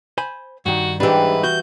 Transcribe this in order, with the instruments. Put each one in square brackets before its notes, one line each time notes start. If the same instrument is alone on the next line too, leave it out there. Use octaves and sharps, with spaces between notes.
[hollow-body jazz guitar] C5 G#5 B5
[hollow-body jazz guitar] G2 D#3 [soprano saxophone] F#4
[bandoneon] G#2 [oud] E3 G3 [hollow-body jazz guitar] D4 G4 [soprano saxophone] B4
[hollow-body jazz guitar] F#4 [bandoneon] G6